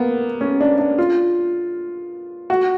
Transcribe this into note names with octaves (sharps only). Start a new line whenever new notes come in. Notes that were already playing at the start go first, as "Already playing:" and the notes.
Already playing: A#3 B3
C#4
D4
D4
F4
F#4